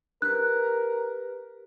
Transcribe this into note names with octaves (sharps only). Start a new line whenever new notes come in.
G4 A#4 B4 F#6